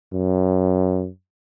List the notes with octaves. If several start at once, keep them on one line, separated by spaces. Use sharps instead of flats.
F#2